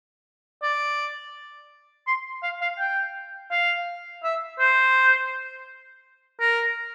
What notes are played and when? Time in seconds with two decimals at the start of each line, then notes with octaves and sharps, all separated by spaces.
0.63 D5
2.07 C6
2.43 F5
2.61 F5
2.79 G5
3.51 F5
4.23 E5
4.59 C5
6.40 A#4